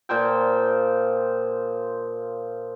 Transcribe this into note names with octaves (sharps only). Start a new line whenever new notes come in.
A#2 F3 C5 G5